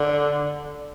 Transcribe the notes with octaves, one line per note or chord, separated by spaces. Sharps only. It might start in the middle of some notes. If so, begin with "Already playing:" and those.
Already playing: D3